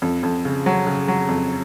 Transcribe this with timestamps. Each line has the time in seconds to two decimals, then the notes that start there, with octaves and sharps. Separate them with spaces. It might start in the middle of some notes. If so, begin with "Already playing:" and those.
0.02 F2
0.23 F2
0.45 C#3
0.66 F#3
0.87 C#3
1.08 F#3
1.29 F2